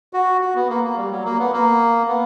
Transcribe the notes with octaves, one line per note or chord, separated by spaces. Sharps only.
F#4
F#4
B3
A#3
A#3
G3
F#3
A#3
B3
A#3
B3